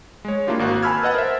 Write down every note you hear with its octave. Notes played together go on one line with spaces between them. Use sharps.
G#3 C#5
A#3 D4 E4 F4 G4
G#1 A#3 F#4 F#6
G#5 A5 B5 E6 F6 G#6
B4 D#5 F#5 A6
A#4 C5 E5